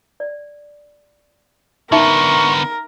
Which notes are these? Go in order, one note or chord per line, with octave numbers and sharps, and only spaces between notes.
D5
D3 B3 C#4 D#4 A#4 E5 C#6